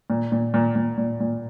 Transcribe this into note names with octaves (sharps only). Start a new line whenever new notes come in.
A#2
A#2
A#2
A#2
A#2
A#2